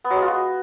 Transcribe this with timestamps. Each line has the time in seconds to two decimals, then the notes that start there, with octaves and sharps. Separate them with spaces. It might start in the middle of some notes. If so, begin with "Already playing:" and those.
0.04 B3
0.10 F#3
0.16 G#3
0.22 F4
0.28 F#4